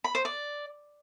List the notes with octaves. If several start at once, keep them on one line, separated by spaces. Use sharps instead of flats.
B5
C5
D5